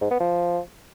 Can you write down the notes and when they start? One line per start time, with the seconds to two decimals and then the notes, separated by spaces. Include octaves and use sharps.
0.01 G#2
0.11 B3
0.20 F3